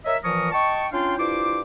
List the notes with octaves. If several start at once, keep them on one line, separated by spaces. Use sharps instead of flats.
A#4 C#5 D#5 E5
A#2 E3 F3 A#4 C#6 D#6
D#5 G5 A5 C#6
C#4 D4 F4 F5 G5 C6
G2 E4 F4 C5 D6